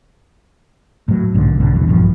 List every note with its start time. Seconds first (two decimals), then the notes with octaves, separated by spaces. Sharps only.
1.08 A2 F#3
1.34 B1 G#2 D3
1.60 B1 B2 D3
1.74 E2 D3 E3
1.88 A#1 G2 F3